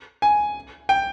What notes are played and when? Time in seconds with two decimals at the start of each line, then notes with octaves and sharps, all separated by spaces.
0.22 G#5
0.89 G5